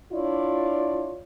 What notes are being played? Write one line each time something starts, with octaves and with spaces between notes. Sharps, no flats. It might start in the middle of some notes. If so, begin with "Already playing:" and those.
D4 E4 F4 C#5 D5